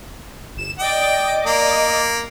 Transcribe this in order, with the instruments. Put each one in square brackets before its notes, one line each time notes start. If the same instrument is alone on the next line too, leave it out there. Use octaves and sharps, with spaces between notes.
[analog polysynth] G1 E7
[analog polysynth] D5 D#5 D6 [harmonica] G5
[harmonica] A#3